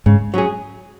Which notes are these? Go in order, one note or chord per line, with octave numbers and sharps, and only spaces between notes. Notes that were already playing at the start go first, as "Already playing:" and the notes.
G#2 C#3
F#3 C#4 G#4